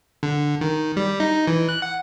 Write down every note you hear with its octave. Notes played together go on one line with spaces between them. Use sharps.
D3
D#3
G3
D#4
E3
F#6
F#5